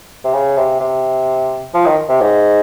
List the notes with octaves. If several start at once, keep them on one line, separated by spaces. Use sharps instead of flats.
C3
C#3
C3
C3
F3
D#3
C3
G#2